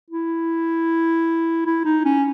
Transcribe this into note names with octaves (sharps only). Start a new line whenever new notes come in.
E4
E4
D#4
C#4